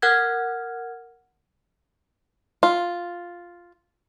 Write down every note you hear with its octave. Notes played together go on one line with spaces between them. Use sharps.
A#4 F#5 F6 F#6 G#6
F4